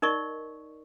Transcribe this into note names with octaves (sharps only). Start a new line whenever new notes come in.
D#4 A#4 D5 D#5 C#6